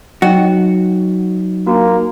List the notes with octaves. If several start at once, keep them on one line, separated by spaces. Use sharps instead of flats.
F#3 D#4 F#4 D#5 G5
A#3 D4 F#4